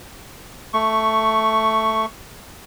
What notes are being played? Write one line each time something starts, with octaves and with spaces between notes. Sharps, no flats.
A3 C#6